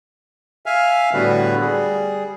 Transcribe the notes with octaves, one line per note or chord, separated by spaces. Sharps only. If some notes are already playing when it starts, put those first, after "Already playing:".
E5 F5 G#5 F6
A2 D3 G3 B3 F#4 B4
G3 G#4